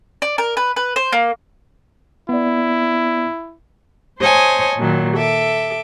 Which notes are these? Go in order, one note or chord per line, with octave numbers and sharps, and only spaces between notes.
D5
A#4
B4
B4
C5
A#3
B3 E4 D5
C5 C#5 D#5 G#5 A5
A#2 D#3 F#3
A4 E5 D6